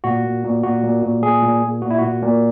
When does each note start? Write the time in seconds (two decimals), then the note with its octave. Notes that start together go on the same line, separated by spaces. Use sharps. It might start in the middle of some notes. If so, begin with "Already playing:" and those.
0.04 A#2 F#4
0.24 A#2
0.44 A#2
0.63 A#2 F#4
0.83 A#2
1.03 A#2
1.22 A#2 G#4
1.43 A#2
1.62 A#2
1.82 A#2 F#4
1.90 E4
1.99 A#2 F#4
2.22 A#2